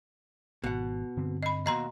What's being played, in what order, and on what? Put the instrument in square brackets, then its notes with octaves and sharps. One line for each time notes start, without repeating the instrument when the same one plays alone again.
[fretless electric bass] G#1 [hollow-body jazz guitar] B2 F#5
[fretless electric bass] G2 D3 C4
[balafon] D#5 B5
[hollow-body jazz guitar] D#2 B2 [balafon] D#5 A#5 C6